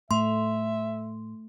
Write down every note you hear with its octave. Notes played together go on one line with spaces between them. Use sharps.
A2 A3 E5 C6